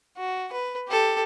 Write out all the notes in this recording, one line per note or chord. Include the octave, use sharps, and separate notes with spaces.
F#4
B4
G4 A4